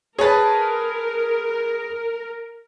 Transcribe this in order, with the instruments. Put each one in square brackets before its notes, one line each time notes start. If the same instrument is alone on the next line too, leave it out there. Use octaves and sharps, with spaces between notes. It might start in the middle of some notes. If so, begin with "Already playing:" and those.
[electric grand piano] G#4 B4 [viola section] A#4 [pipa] C#5 A5